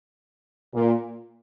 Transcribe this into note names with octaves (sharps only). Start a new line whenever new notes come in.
A#2